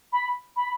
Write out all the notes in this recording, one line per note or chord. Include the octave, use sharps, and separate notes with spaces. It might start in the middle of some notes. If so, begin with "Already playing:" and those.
B5
B5